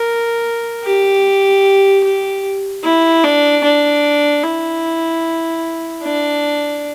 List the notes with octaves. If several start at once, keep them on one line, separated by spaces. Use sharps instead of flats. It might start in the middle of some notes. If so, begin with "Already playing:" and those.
Already playing: A#4
G4
G4
E4
D4
D4
E4
D4